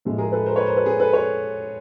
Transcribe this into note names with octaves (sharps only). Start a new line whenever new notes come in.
A2 F3 G#3
G#4 A#4
A4 B4
A#4 C5
B4 C#5
A#4 C5
A4 B4
G#4 A#4
A4 B4
B4 C#5